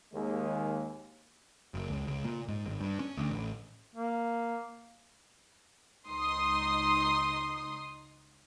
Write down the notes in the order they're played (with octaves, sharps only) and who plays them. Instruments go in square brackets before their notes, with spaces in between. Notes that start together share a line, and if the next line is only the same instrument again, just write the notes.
[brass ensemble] D#2 G#3
[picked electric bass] F#1
C#2
C#2
A#2
G#2
G#1
G2
C#4
D2
A1
[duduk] A#3
[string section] C#2 D#4 C6 D#6